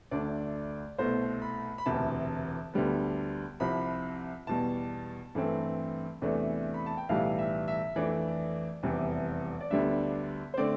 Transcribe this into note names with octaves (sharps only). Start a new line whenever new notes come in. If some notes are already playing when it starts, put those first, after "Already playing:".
D2 D3 A3 D4 D5
C2 B2 A3 C5
B5
B5
E1 D2 C3 E3 A5
D2 D3 G3 B3
C2 C3 F3 B5
E2 B2 G3 A5
G2 E3 A3 C4
E2 C3 E3 A3 D4
B5
A5
G5
B1 A2 E3 G3 F5
E5
E5
F2 E3 A3 D4 D5
F1 E2 C3 E3 G3
D5
D2 D3 G3 B3 D4 E5
C5
D3 A3 C4 D5